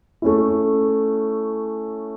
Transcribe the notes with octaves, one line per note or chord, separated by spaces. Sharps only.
A3 C#4 E4